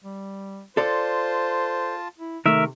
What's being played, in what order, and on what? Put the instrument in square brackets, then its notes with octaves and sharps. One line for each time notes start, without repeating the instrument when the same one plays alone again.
[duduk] G3
[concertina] F4 A5 [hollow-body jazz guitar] A4 D5 [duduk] C5
[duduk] E4
[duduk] C3 [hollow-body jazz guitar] D#3 A3 [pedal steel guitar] A#4 E5